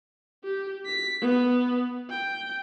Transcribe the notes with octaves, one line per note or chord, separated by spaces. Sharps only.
G4
B6
B3
G5